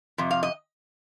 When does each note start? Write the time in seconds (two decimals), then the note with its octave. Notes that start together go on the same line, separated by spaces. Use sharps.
0.18 F2 C3
0.31 F5
0.43 D#5